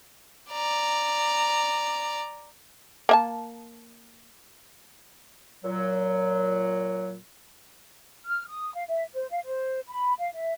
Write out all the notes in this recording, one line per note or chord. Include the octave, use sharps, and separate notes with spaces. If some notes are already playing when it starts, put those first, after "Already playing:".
D5 A#5
A#3 E5 A5
A#2 F#3
F6
D#6
F5
E5
C5
F5
C5
B5
F5
E5